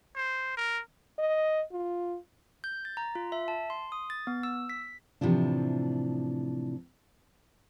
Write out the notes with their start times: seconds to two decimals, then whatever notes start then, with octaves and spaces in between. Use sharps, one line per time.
0.15 C5
0.57 A#4
1.18 D#5
1.72 F4
2.64 G6
2.85 A6
2.97 A#5
3.15 F4
3.32 E5
3.48 A5
3.70 C6
3.92 D#6
4.10 A6
4.27 B3
4.43 E6
4.69 B6
5.21 A2 C3 E3 F3 D4